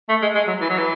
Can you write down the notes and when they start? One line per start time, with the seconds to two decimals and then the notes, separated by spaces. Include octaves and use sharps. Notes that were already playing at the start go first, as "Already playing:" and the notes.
0.09 A3
0.22 G#3
0.35 G#3
0.47 F#3
0.61 E3
0.70 F#3
0.78 E3